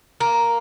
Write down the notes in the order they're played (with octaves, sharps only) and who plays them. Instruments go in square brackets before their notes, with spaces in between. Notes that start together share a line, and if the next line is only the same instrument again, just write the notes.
[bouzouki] A#3